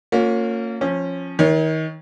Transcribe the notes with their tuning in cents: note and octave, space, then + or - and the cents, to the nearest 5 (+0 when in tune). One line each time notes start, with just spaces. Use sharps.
A#3 -30 C#4 +0 F4 +35
F3 +0 C#4 -20
D#3 +30 C#5 +0